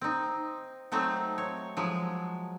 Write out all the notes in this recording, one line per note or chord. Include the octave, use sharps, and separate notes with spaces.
C4 D#4
F#3 A3 C4 D#4
C#5
F3 F#3 G#3